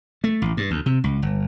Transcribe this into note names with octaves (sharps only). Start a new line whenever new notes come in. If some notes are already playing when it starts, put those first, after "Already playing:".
A3
A1
G2
D2
C3
C#2
G1